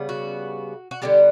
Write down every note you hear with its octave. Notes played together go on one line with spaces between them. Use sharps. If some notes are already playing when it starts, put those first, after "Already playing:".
Already playing: C#3 G3 B3
F#4
F#4
D3 G3 B3 G4